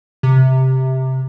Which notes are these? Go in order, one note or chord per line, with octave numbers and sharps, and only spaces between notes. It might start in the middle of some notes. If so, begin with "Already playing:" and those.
C3